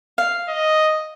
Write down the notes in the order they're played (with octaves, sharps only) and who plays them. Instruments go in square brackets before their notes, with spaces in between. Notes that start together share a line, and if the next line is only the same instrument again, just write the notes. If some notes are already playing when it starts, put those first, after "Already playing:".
[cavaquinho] F5
[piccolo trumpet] D#5